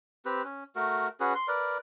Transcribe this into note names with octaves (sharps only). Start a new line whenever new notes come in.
C4 G4 B4
C#4
A3 F#4 A#4
C#4 F#4 G#4 B4
C6
A#4 B4 D5